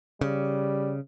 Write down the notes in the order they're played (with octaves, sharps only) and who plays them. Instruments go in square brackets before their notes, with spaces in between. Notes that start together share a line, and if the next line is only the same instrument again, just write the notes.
[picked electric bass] C#3 [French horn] G3